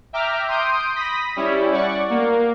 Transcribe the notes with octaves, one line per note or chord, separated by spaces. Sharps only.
E5 G5 A#5 D6 F6
C6 D#6 G6 D7
B5 D#6 A#6 B6
G3 C#4 E4
D5 F#5 C#6
A#3